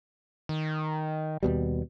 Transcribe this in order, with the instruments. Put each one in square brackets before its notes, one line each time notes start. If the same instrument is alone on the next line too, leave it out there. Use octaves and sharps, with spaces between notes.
[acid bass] D#3
[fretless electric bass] D#2 B2 G3